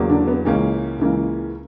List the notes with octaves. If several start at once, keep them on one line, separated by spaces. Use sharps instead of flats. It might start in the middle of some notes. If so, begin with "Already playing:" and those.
Already playing: E2 C#3 F#3 A#3
D3 D4
B3
C#2 C#3 E3 A#3 C#4
C#2 C#3 E3 A#3